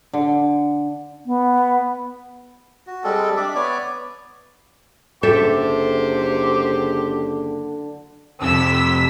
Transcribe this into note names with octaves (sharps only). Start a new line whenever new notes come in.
D3
B3
F#4
G3 G#3 C4 A4
D4 D5 E5
B3 C#5 D5
F#1 D3 G4 A4 C5 E5 G5
F2 C3 E6 B6